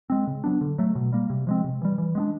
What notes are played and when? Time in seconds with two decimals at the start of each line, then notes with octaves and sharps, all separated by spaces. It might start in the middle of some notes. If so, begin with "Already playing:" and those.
0.10 G#3 C4
0.27 C#3
0.44 F#3 B3 D4
0.61 D3
0.78 F#3 A3
0.95 B2
1.13 G3 A#3
1.30 C3
1.47 F3 G#3 C4
1.64 C3
1.82 E3 G3
1.98 E3
2.15 G#3 B3 D4